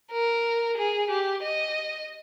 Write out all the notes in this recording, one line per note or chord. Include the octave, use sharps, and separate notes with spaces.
A#4
G#4
G4
D#5